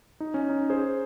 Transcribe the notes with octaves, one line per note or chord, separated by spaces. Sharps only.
D#4
C#4
D#4
G#4 C5